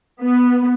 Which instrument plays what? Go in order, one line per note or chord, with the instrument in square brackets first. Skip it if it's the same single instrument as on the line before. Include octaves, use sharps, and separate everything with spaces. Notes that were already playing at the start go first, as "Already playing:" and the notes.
[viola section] B3